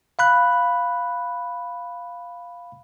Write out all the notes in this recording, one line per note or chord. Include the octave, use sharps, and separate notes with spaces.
F5 B5 F#6